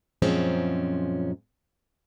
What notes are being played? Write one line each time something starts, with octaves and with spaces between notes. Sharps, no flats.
F#2 A#2 F3 G#3 C4 C#4